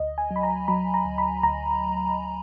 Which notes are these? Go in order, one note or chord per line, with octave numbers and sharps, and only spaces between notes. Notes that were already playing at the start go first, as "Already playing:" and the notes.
Already playing: D2 D#5
G#5
F#3
B5
A#5
F#3 B5
A#5
D2
B5
D2 A#5